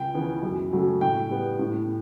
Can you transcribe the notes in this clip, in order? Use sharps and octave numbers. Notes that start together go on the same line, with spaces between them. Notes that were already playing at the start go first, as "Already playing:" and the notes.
Already playing: C#2 G5
C#3 E3 B3
F#2
C#3 F#3 A3
A2 G5
G3 B3
A2